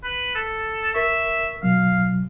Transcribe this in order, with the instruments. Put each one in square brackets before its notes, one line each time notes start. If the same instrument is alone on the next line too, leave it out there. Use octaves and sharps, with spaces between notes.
[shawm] B4
A4
[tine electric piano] A#4 C#6 [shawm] E5
[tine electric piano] B2 F#3 [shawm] F5